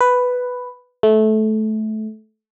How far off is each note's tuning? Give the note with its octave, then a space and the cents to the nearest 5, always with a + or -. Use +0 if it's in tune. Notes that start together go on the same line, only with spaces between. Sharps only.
B4 +5
A3 -20